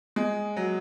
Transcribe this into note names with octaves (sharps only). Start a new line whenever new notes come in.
G#3
F#3